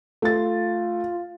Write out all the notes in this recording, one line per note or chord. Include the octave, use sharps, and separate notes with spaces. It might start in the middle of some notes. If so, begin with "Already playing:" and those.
A3 F4 A6